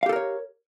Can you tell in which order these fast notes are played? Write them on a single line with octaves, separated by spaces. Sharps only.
F5 G4 A4 A#4 C#5